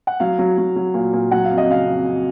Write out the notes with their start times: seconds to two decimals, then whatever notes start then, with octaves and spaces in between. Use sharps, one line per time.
0.07 F#5
0.20 F#3 F5
0.39 F#3
0.58 F#3
0.76 F#3
0.94 A#2
1.13 A#2
1.31 F#3 F#5
1.45 F5
1.50 F2
1.58 D#5
1.68 C#3 F5
1.87 F2
2.05 F2